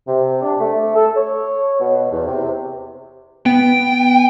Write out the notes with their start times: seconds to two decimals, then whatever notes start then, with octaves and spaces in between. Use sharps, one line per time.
0.07 C3
0.42 D4
0.60 A3
0.96 A4
1.16 C#5
1.80 B2
2.12 E2
2.27 C3
3.46 B3 G5